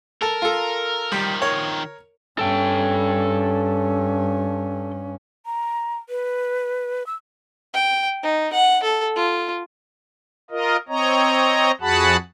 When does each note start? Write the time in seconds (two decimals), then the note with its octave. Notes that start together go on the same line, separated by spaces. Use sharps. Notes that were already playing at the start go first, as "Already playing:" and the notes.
0.22 A4 A#4 A5
0.42 F4 A4
1.12 D#3 F3 G3
1.41 A#4 C#5
2.39 G2 C#4 A4 G5
5.46 A#5
6.09 B4
7.06 E6
7.74 G5
8.23 D#4
8.53 F#5
8.83 A4
9.16 F4
10.51 F4 A#4 D#5
10.88 C4 C#5 D#5 A#5
11.81 F2 F#4 G#4 F#5 A5 B5